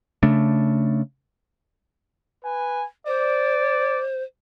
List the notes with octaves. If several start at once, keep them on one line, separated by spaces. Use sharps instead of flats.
C#3 A3 D4
B4 G#5
C5 D5